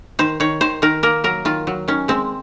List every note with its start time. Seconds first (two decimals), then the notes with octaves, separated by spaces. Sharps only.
0.19 D#3 C5
0.40 D#3 C#5
0.61 D#3 C5
0.82 D#3 A#4
1.03 A#3 A#4
1.24 F#3 A#4
1.45 D#3 F4
1.67 F#3
1.88 D#3 C#4
2.08 G#3 C4